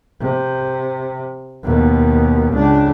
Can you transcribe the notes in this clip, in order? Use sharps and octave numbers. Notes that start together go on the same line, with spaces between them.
C3
D#2 B2
C#2 D4